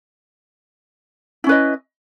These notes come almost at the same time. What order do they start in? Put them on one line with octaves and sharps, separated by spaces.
E4 C#4 B4 D#5